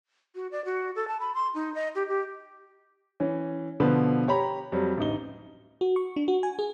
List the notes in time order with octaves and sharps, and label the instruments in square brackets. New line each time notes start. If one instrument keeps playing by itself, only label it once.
[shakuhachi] F#4
D5
F#4
A4
A5
B5
C6
D#4
D#5
G4
G4
[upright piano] E3 C#4
B2 D3 F3 B4 C5
G4 C#5 A#5 B5
F2 F#3 G3
A1 D2 D#4 G7
[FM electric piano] F#4
C#6
D4
F#4
G#5
G#4